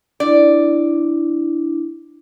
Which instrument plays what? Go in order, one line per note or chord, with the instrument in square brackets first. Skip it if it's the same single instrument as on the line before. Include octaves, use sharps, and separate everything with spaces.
[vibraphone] D4 E4 [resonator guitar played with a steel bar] D5